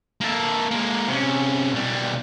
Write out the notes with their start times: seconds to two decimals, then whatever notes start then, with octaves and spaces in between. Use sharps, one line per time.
0.21 A#3 A4
0.71 G#3 A#3
1.08 C3 C#4
1.72 B1 G3